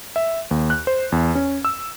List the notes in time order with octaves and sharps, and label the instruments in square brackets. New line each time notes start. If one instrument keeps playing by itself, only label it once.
[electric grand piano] E5
D#2
F#6
C5
E2
C#4
E6